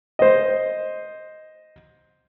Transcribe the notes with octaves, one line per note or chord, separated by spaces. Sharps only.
C5 D#5